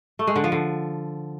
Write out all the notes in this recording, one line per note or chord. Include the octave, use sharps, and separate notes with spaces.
A3
G#3
D3
F3
D3